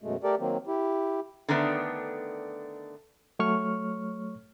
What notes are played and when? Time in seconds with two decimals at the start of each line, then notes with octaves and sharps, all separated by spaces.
0.03 F#2 B2 G#3 A3
0.24 A3 G4 A4 A#4 D5
0.40 D#3 F#3 A#3 C4
0.68 E4 G4
1.48 D3 D#3 A3 B3 D4
3.39 F#3 A3 C#5 C#6 F6